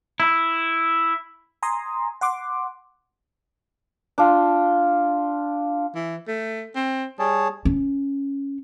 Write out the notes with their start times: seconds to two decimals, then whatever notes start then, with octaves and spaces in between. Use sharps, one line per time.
0.20 E4
1.63 G#5 A#5 C6 D#6
2.21 F#5 C6 D6
4.18 D4 F4
5.95 E3
6.28 A3
6.75 C4
7.19 G3 G#4 C#5 A5
7.65 C#4